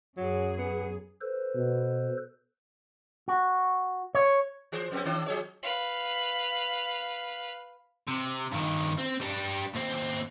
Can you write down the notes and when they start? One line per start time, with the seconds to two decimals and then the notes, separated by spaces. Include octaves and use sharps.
0.17 F#2 F#3 G#4
0.58 B3
1.21 A4 B4 C5
1.55 B2
3.28 F#4
4.15 C#5
4.72 E3 G#4 C5
4.91 F2 C4 C#4
5.05 D#3 D4
5.26 F3 G#4 C#5
5.63 B4 F5
8.07 C3
8.52 G2 D#3
8.98 C4
9.21 G3 D4
9.75 D#2 C4